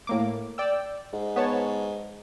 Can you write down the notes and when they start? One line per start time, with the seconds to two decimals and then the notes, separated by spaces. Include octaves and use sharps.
0.07 A2 A#3 D6
0.58 D5 G5 E6
1.13 G#2
1.36 B3 C#5 A5